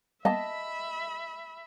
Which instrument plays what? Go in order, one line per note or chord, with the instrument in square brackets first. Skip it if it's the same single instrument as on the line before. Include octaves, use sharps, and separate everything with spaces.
[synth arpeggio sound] G3 A#3 B3 [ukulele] D#5 A5 [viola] E5 B5